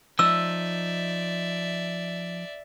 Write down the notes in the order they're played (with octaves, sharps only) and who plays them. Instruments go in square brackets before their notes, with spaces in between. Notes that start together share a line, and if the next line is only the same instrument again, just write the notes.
[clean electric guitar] F3 D#4 [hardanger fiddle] D5 E5 [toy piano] E6